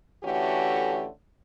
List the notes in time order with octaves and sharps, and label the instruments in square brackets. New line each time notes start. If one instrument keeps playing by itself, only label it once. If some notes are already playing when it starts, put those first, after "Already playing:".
[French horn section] D3 E3 A3 C#4 F#4 G4